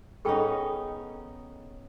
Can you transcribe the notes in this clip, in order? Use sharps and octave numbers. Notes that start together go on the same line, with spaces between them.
B3 C#4 D#4 G#4 A4 G5